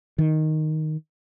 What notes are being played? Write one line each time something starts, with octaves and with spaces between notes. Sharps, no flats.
D#3